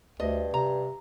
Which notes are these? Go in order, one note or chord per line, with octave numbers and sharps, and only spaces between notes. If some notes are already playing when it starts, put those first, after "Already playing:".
D2 G2 D#5
C3 A#5